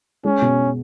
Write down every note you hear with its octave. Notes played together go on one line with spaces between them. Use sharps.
G#3 C#4
B2